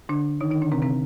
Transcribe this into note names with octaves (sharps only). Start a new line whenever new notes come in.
D3 D4
D#3 D#4
D#3 D#4
D3 D4
C3 C4
C3 C4